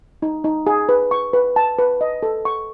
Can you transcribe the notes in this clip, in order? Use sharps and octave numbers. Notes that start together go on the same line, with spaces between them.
D#4
D#4
G#4
B4
C#6
B4
A5
B4
D#5
A4
C#6